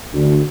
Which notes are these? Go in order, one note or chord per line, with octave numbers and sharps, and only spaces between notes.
D2